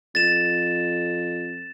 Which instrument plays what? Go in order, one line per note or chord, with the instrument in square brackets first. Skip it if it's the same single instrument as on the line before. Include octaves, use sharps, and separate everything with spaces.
[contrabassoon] F2 [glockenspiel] A6 E7